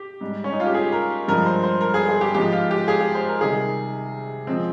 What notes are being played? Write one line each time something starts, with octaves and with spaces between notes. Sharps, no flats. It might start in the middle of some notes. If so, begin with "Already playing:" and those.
Already playing: G4
G#2 G3
C#4
D#4
F4
G4
G#4
A#4
G2 F3 G#3 A#4
C5
C5
A#4
G#4
G#4
G4
G#2 F3 G#3 G4
F4
G4
G#4
G4
C5
A#4
C3 D#3 G3 G#4
F3 G#3 C4